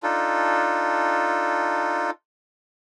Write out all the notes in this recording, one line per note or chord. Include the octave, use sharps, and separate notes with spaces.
D4 D#4 F4 A4